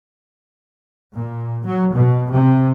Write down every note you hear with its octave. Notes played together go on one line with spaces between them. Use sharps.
A#2
F#3
B2
C3